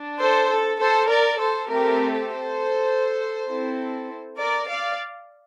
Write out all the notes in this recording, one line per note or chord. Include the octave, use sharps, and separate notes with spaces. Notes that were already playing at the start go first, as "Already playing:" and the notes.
Already playing: D4
A4 C5
A4
A4 C5
A#4 D5
A4 C5
A3 C4 G4 A#4
A4 C5
C4 E4 A4
A#4 D5
D5 F5